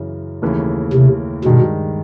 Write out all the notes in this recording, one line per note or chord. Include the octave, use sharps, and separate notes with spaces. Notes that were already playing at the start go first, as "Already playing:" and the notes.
Already playing: F#2 C#3 E3
D#2 C#3 E3 A3
C3
G2 B2 D#3 G#3